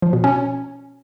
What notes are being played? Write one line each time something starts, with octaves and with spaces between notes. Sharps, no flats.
F3
B2
C#4